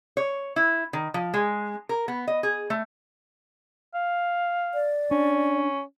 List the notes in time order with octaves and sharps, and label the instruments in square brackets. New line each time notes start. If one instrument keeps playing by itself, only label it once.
[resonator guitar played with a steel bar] C#5
E4
D#3
F3
G#3
A#4
B3
D#5
G#4
A3
[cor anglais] F5
[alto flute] D5
[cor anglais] C#4 [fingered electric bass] D4